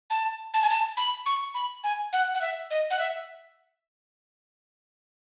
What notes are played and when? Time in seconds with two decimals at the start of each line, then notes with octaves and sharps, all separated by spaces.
0.10 A5
0.54 A5
0.62 G#5
0.70 A5
0.97 B5
1.26 C#6
1.54 B5
1.84 G#5
2.13 F#5
2.34 F#5
2.41 E5
2.70 D#5
2.90 F#5
2.99 E5